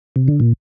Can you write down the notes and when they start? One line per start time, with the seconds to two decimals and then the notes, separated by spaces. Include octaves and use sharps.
0.16 C3
0.28 D3
0.40 A#2